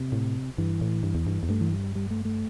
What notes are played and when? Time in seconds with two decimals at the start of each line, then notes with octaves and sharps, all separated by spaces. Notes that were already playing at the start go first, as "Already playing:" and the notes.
Already playing: C3
0.12 A2
0.58 G2 E3
0.81 A2
1.03 G2
1.15 E2
1.27 G2
1.43 E2
1.49 G2 A3
1.61 E3
1.72 G3
1.95 G3
2.11 A3
2.25 A3